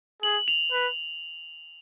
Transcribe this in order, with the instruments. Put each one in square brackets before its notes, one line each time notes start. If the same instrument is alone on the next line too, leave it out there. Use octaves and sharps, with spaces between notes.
[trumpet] G#4 [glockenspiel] F#7
[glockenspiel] F7
[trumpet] B4